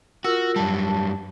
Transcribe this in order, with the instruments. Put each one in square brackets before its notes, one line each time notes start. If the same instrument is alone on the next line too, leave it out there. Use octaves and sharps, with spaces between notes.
[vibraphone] F4 A#4 E6 [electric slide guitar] F#4
[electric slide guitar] F#2 G3 [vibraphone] A5